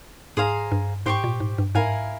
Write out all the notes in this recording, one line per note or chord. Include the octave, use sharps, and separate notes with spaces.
G#2 G#4 C5 F5 A#5
G2
G#2 G4 C5 G5 C#6
A#2
G#2
G2
G#2 E4 A#4 F5 G#5